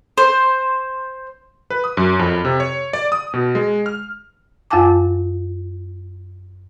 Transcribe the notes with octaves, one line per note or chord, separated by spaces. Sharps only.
C5
B4
D#6
F#2
F2
C3
C#5
D5
D#6
B2
G#3
F6
F#2 F4 F5 G#5 A5 D6